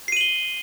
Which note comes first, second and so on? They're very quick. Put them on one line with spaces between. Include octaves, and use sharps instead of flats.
C7 D#7 F#7 G7